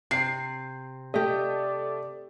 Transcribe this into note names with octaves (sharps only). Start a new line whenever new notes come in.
C3 C7
A3 G4 D5 D#5